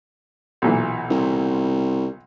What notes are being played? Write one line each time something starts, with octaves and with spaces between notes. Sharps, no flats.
B1 A#2 E3
C2